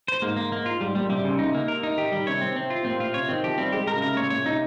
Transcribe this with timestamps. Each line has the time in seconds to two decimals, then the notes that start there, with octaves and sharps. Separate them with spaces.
0.08 C5
0.22 G#2 A#3
0.37 A#3
0.52 A#3
0.66 F4
0.81 G#2 G3
0.95 A#2 G3
1.09 C3 G3
1.25 C#3
1.39 D#4
1.54 A#3
1.68 A#4
1.83 D#4
1.97 D#3 G4
2.12 D#3 G3
2.27 C3 C#5
2.41 C4
2.56 C4
2.70 F4
2.85 A#2 C4
3.00 A#2 F4
3.14 C3 C#5
3.28 D#3 C4
3.43 F3 G4
3.58 G3 C4
3.72 G#3 G4
3.82 G#3
3.87 A#4
3.93 C#3
4.01 C3 A#4
4.16 A#2 C#5
4.30 A#2 C#5
4.46 C3 D#4